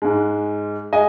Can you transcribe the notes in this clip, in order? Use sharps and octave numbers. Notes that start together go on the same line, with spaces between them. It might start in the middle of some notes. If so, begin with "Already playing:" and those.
G#2 G#3
G#3 D#5 G#5